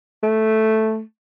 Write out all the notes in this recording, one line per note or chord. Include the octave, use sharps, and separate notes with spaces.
A3